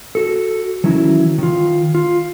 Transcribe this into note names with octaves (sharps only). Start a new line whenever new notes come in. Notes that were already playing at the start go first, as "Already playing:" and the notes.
F#4 A4
D#3 E3 F#3 C#4 E4
D#3 F4
F4